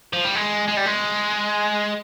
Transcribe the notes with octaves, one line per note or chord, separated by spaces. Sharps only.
F3
G3
G#3
G#3
G3
G#3